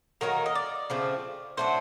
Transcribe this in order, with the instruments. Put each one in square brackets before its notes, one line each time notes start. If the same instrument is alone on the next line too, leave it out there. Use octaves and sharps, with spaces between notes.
[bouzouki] D#3 F#3 A#3 D#4 [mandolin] A#4
[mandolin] D#5
D5
[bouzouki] C#3 F3 A3 C4
[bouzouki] F#3 A3 D4 [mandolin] C5